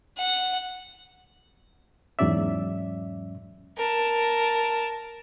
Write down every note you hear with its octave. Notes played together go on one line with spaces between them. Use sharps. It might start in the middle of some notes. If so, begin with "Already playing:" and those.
F#5
E2 G#2 F#3 C#4 D5 E5
A#4 A5